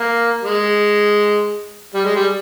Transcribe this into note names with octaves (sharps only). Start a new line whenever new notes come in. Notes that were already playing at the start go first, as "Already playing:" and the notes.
Already playing: A#3
G#3
G3
G#3
G3